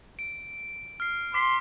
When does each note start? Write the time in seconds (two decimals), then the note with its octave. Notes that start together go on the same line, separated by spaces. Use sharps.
0.19 D7
1.00 F6 C7
1.34 C6 D6 B6